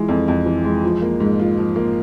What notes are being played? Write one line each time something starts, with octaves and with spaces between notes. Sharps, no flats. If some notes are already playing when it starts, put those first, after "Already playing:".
Already playing: E3 G#3 F4
F2
F2
E3
G#3
F3
A#3
G#2
F4
F3
A#3